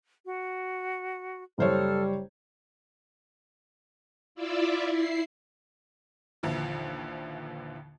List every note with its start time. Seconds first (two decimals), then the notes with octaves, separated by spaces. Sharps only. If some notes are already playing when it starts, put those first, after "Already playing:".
0.25 F#4
1.59 F#1 G3 A4 C5 C#5 F6
4.35 E4 F4 D5 E5
4.88 E4 C7
6.43 A#1 D#2 D3 E3 F3